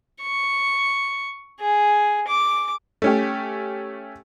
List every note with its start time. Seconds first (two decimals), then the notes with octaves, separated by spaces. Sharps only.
0.22 C#6
1.60 G#4
2.28 D6
3.02 A3 C#4 G4